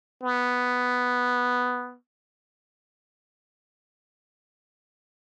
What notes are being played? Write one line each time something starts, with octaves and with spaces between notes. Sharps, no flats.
B3